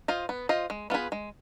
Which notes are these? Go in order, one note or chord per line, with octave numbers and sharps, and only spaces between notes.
F4 C5 D#5
B3
F4 C5 D#5
G#3
B3 F4 G#4 B4
G#3